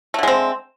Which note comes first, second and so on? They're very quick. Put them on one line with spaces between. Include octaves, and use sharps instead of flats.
A3 D3 G#3 C4